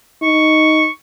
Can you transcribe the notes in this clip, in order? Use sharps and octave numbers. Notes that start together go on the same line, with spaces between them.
D#4 C#6